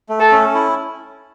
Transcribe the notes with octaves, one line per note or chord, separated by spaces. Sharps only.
A3
A4
C#4
E4